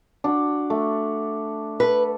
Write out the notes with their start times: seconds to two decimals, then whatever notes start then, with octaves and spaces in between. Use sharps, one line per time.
0.24 D4 F#4
0.70 A3
1.80 A4 B4